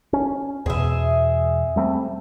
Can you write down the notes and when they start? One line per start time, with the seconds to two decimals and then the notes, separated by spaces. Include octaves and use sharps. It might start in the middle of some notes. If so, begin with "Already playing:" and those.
0.13 C#4
0.66 E2 B2 G#4 E5
1.76 G3 A3 C4